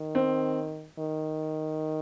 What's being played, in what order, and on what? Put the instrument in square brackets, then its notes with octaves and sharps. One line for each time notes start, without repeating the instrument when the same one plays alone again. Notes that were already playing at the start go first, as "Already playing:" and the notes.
Already playing: [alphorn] D#3
[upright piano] C4
[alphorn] D#3